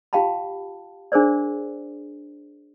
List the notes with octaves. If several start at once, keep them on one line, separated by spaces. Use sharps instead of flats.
F4 G4 F5 G5 A5 B5
D4 G#4 A#4 C5 D5